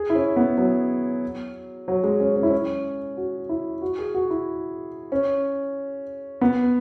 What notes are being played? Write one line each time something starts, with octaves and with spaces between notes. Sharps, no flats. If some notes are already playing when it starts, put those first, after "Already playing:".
Already playing: G#4
E4
C#4
B3
F#3
F#3
G#3
C#4
C#4
E4
C#4
F#4
E4
F#4
G#4
F#4
E4
C#4
B3